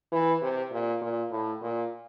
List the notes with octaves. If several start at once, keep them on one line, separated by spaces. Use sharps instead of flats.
E3
C3
A#2
A#2
A2
A#2